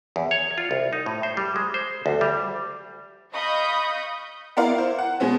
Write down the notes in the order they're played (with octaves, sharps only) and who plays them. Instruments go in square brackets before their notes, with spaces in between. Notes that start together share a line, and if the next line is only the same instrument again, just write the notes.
[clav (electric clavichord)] E2
C#5
F4
C2
D#4
A2
C5
G3
G#3
C5
D2
G3
[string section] D#5 F5 B5 C#6 D#6 G6
[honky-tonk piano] B3 E4 A#4 D5 F5
E4 C5
F#5
B2 G#3 B3 C#4